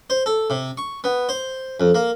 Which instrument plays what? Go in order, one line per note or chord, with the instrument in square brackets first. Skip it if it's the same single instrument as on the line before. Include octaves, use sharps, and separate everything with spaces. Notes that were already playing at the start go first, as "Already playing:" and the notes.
[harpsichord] C5
A4
C3
C#6
B3
C5
F2
A#3